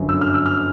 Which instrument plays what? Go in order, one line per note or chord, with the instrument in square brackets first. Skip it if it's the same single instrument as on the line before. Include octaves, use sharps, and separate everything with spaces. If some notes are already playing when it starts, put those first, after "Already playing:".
Already playing: [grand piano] G1 F#2 D3
E6
F6
E6
F6